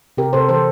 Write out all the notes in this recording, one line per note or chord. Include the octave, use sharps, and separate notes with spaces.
C3 G4 A#4
C3 A4 C5
E3 A4 C5